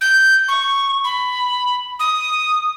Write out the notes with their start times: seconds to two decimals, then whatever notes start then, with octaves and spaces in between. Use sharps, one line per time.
0.01 G6
0.48 C#6
1.04 B5
1.99 D#6